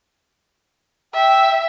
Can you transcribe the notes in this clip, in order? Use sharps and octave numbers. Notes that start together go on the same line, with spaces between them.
E5 G5